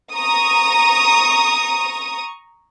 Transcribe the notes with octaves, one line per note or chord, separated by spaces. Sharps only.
A#5 C#6 D#6